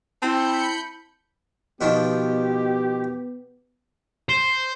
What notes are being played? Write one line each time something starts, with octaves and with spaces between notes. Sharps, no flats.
C4 E4 A5 B5 G6 C#7
B2 D#3 F3 B3 G4
C5